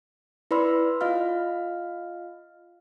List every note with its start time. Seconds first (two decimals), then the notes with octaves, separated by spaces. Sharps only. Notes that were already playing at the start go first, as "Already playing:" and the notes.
0.51 E4 B4 D5 B5 C6 E6
1.01 F4 D#5 F5 F6